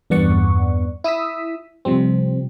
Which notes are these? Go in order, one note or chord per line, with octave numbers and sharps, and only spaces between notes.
E2 G2 B3 D5 F#5 C#6
E4 D#6 E6 B6
C3 F3 G3 C4